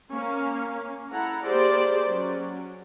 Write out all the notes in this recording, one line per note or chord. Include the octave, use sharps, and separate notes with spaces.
A#3 C#4 F5
E4 A4 F#5 A#5
A#3 G4 G#4 C5 D5
F#3 C#4